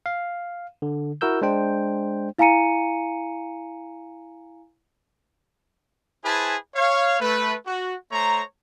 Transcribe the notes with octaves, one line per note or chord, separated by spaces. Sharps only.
F5
D3
E4 F#4 A#4 E6 G6
G#3 D4 C5 G5
E4 F5 G#5 A#5 C#7 D#7
E4 G#4 B4 C5 G#5 A5
C#5 F5
A3 B4
F#4
A3 C5 C#5 A#5